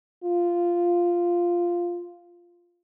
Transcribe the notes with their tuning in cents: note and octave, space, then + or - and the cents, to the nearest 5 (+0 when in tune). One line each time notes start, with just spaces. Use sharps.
F4 -5